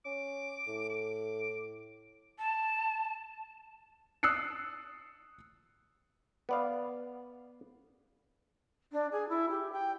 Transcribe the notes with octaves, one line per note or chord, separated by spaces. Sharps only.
C#4 D6
A2
D6
A5
D#6 E6 F#6 C7 C#7
B3 D5 F5
D4
G#4
E4
G4
G5